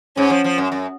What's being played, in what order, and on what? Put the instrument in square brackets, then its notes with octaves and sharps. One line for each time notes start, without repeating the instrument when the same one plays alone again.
[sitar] G#2 [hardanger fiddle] C#4
[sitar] F3
F3
F#2
F#2